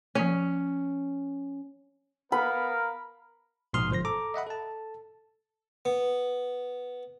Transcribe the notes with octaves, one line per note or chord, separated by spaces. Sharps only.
F3 A#3 C#4
B3 A#4 F5 B5
A#1 G#2 B2 C6 D#6 F6
G1 F3 C5 C6 A#6
A4 A#5 D6
D#5 E5 F#5 B5
A4 A5
B3